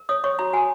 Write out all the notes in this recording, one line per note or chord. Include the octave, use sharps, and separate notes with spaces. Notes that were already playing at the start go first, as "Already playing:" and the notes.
Already playing: A#4
C#5 D#6
C#5 C#6
F#4 A#5
F#4 G#5